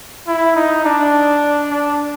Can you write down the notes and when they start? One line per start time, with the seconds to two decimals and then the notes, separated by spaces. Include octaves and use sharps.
0.27 E4
0.56 D#4
0.85 D4
1.71 D4